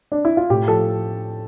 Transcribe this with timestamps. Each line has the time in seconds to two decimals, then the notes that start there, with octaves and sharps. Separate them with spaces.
0.12 D4
0.25 E4
0.37 F4
0.50 A2 G4
0.67 F3 A4